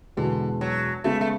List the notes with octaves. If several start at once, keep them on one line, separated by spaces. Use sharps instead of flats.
E2 B2 D3 G#3
F#3
C#3 G#3 A3 B3
A3